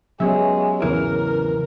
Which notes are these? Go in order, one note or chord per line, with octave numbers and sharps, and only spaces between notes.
F#3 G#3 B3 C#4 G4 C#5 E5
G#1 E2 C#3 E3 A#4